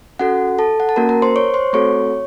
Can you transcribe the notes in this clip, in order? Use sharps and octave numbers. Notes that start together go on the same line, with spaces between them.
C#4 F#4 A4 F#5
A4 A5
F#5
A5
A#3 C#4 F#4 A#4 A#5
A#4 A#5
C5 C6
C#5 C#6
C5 C6
A3 C4 F#4 A4 C#5 C#6